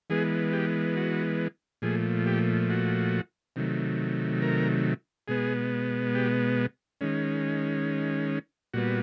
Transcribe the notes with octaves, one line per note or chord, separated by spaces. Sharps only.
E3 G#3 B3 G#4
G4
F#4
A#2 F3 A3 G#4
G4
F#4
C3 D#3 F#3 A3
A#4
B2 G#3 B3 G#4
G4
D#3 G#3 C#4
A#2 G3 B3 F#4